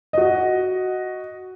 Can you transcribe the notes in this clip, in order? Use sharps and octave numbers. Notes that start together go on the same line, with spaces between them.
F#4 D#5